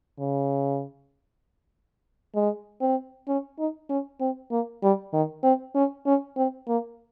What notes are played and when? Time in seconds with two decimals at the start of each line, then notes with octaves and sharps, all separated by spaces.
0.19 C#3
2.35 G#3
2.81 C4
3.28 C#4
3.59 D#4
3.89 C#4
4.20 C4
4.51 A#3
4.83 G3
5.13 D#3
5.44 C4
5.75 C#4
6.06 C#4
6.37 C4
6.68 A#3